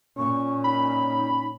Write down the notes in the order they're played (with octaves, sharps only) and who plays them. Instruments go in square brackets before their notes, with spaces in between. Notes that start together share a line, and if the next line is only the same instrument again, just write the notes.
[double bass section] A#2 [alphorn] C#4 [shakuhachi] C#6
[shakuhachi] D#4 [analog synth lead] B5